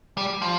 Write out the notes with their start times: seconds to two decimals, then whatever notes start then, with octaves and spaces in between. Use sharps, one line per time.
0.17 G3
0.42 F3